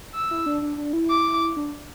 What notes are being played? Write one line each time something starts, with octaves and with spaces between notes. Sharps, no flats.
E6
E4
D4
D4
D4
E4
D6
D4